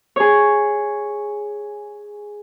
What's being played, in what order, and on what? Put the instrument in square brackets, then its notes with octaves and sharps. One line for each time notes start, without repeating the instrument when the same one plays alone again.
[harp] G#4 C#5